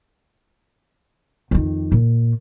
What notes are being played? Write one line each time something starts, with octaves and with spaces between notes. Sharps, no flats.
F2 D#3
A#2